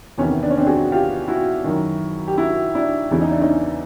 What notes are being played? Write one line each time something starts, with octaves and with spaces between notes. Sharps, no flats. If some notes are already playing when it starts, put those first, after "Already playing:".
E2 C3 D#3 B3 C#4
D4
C#4
C4 D4
F#4 G#4
F4 G4
E4 F#4
F#2 D#3
G4
E4 F#4
D4 E4
E2 C#3 E3 E4
D#4
D4
C#4 D#4